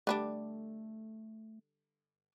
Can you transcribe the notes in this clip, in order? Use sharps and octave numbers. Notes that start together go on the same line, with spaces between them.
D3 G3 A3 D4